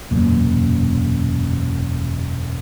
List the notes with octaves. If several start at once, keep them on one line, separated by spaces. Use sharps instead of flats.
E1 F#2 A#2